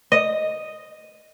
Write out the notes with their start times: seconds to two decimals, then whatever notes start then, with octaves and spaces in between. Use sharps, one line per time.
0.12 D#5